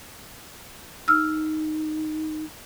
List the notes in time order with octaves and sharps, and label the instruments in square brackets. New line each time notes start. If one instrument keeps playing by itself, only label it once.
[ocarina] D#4 [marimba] E6 F6